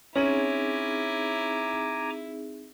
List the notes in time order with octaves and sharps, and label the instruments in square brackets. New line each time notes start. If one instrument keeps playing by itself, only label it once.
[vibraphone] C4 D#4 G#4 [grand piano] C#4 [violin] E4 [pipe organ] G#5 A#5 D6